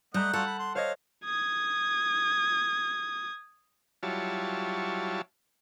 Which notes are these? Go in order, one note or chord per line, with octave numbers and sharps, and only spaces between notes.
G3 A3 D#5 F#5 A#5 F#6 G6
D4 F4 F#4 A4 F#5
B5
C6
C5 C#5 D#5 F5
D#6 G#6
F#3 G3 E4 F4 C#5 A5